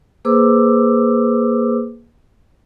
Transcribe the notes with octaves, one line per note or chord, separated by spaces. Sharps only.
A#3 G#4 B4 C5 D6 E6